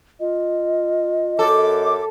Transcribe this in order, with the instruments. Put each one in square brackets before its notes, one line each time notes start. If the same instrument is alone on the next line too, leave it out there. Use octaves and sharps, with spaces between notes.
[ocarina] F4 [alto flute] D#5
[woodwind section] F#2 D6 [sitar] A4